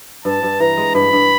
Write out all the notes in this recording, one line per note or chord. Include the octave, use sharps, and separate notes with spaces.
G2 A5
G2
E3 A#5
G#3
G2 B5
G2